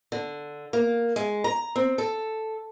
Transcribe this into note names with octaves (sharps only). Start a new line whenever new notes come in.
D3
A#3
G#3
A#5
C4
A4